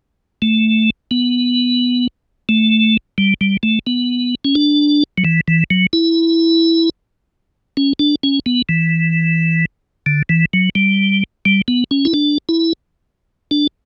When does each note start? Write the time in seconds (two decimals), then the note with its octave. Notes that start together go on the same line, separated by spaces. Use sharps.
0.42 A3
1.11 B3
2.49 A3
3.18 G3
3.41 G3
3.63 A3
3.87 B3
4.45 C#4
4.55 D4
5.18 F#3
5.25 E3
5.48 E3
5.70 F#3
5.93 E4
7.77 C#4
7.99 D4
8.23 C#4
8.46 B3
8.69 E3
10.06 D3
10.29 E3
10.53 F#3
10.75 G3
11.45 G3
11.68 B3
11.91 C#4
12.05 E4
12.14 D4
12.49 E4
13.51 D4